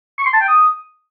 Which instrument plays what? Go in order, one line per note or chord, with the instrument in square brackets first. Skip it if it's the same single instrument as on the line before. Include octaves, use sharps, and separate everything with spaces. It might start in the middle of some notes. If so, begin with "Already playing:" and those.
[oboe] C#6
C6
A5
G5
D#6